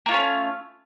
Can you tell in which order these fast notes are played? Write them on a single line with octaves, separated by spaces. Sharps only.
A#3 F4 A3 C#4